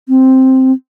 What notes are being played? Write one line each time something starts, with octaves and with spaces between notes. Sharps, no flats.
C4